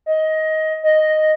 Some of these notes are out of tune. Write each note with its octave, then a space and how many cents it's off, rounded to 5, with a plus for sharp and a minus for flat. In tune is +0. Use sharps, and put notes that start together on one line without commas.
D#5 +15
D#5 -5